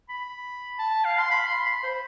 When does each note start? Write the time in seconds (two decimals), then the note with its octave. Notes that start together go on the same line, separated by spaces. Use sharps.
0.10 B5
0.79 A5
1.05 F5
1.19 C6
1.31 B5
1.48 C6
1.66 B5
1.84 C5